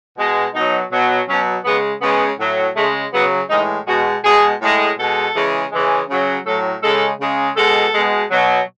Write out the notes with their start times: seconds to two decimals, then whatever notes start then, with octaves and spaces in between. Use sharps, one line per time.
0.17 B2 G#3
0.54 B2 F#3 D#4
0.91 B2 F#3
1.28 B2 F#3 C#4
1.65 C#3 G#3 B3
2.02 C#3 G#3 B3
2.39 A2 F#3
2.76 C#3 G#3 A3
3.13 C#3 F#3 B3
3.50 A2 E3 G#3 D#4
3.87 B2 G#3 F#4
4.24 B2 G#3 G#4
4.61 A2 G#3
4.98 B2 G#3 A4
5.35 C#3 E3 G#3
5.72 C#3 E3 G#3
6.09 C#3 F#3
6.46 A2 F#3 A4
6.83 C#3 G#3 A4
7.20 C#3 G#3
7.57 B2 G#3 A4
7.94 B2 G#3
8.31 B2 F#3